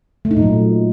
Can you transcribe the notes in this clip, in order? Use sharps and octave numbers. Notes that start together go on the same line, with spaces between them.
A3
D#4
A#2
F#3